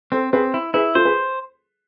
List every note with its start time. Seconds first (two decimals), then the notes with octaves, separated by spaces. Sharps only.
0.12 C4 A4 C5
0.33 C4 G#4 B4
0.54 E4
0.74 E4 G#4 B4
0.95 F4 A4 C5
1.05 G#4 B4